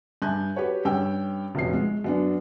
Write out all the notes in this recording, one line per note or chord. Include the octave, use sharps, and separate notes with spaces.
G2 E5 G#5 A5 F#6 G6
F#4 G4 B4 C#5
G2 C#4 G5 E6
F1 A#1 B2 C#4 C7
G#3
F#2 B3 D4